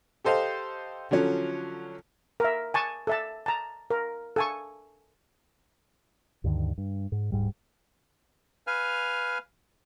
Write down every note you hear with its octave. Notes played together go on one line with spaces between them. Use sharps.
G4 A4 C5 D#5 F5
D3 F3 F#3 C#4
A#4 E5
G#5 A5 C#6
A4 E5 A5
A5 A#5
A#4
A4 G#5 C#6
D2 G2 D3 D#3
G2
G#2
D1 G#2 G3
B4 F5 G#5 F6